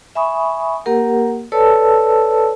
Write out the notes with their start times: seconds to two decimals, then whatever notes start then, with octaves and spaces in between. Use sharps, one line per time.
0.15 E5 G#5 B5 C#6 D#6
0.86 A#3 G4 A#4 F#5
1.52 A4 B4 C#5 D5 A5 E6